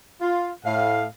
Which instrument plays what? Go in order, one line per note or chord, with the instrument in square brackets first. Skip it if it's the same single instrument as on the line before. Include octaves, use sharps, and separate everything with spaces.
[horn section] F4
A2 F5